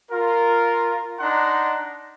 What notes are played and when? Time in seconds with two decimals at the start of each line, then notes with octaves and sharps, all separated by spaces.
0.11 F4 A#4
1.19 D4 D#4 F#5 A#5 C6